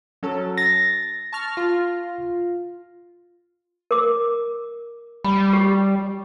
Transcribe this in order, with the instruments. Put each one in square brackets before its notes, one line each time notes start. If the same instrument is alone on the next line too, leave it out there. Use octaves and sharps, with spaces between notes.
[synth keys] F#3 C#4 A4
[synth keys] A6 [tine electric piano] A#6
[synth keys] A5 C#6 F6
F4
[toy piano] A#4 D6
[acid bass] G3 [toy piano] B5
[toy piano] G4